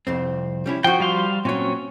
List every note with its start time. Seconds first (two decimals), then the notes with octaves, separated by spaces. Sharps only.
0.07 C2 F2 C4
0.66 G3 C#4 E4
0.84 F3 F#4 G5
1.00 G3 F5 C6
1.45 A#2 F#3 C4 C#4 C#5